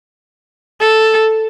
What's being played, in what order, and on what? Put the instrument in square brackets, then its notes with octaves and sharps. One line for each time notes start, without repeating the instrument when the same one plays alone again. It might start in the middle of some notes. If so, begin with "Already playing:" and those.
[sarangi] A4